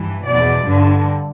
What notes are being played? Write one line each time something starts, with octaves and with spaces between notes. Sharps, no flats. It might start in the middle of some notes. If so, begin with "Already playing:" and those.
Already playing: G2 E3
E2 B2 D5
G2 D3